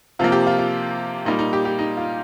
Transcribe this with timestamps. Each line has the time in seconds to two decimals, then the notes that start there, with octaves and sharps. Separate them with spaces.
0.19 C3 F3 A#3 F4
0.32 G4
0.47 F4
0.59 F4
1.25 A#2 G3 A#3 D#4
1.39 D#4
1.53 G4
1.65 G4
1.79 D#4
1.97 F4